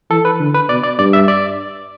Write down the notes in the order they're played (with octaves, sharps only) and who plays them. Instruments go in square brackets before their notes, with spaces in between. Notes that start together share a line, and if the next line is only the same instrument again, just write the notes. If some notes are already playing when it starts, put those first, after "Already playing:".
[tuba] E3 [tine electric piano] A4
[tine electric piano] B4
[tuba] D3
[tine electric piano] B4
[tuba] B2 [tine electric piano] D5
[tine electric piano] D5
[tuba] G2 [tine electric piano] D5
[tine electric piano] E5
D5